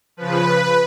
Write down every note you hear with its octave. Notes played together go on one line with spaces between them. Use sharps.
C#3 F3 B4